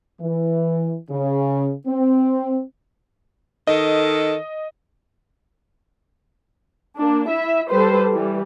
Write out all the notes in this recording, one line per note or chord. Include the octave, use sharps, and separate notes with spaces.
E3
C#3
C4
D#3 A4 D#5
A#3 D4
E4 E5
G3 A4 B4 C5
E3 G3